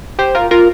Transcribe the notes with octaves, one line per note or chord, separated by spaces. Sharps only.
G4 C5
F4 A#4
F4 A#4